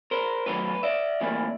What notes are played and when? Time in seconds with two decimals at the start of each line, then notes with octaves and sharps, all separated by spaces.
0.11 A#4 C5
0.47 D#3 F#3 A3 B4 C#5
0.83 D5 E5
1.21 A2 E3 G3 A#3